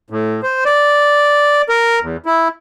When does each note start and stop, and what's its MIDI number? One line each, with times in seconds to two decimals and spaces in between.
0.10 0.41 45
0.43 0.64 72
0.65 1.62 74
1.69 1.99 70
2.02 2.17 40
2.26 2.48 64